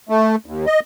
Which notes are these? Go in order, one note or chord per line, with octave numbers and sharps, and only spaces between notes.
A3
D#2
D#5